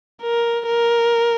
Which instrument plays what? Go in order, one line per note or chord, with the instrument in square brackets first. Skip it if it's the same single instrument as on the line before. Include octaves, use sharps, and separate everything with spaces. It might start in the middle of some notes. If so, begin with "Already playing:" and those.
[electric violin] A#4
A#4